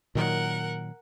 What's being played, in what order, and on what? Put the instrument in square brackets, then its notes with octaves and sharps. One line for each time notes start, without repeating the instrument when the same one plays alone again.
[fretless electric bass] A#2 D#3 F#3 [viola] A#4 F#5